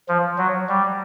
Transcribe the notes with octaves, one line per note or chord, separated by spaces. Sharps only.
F3
F#3
G3